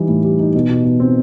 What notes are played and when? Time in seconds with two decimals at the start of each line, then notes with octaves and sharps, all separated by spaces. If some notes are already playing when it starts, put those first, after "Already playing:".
Already playing: E3 G3 D#4
0.09 A2
0.24 G3
0.39 D#4
0.55 B2
0.69 B2
0.85 B2
1.00 C4